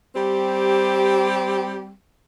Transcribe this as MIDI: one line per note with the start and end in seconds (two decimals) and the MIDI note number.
0.16 1.94 55
0.16 1.94 60
0.16 1.94 67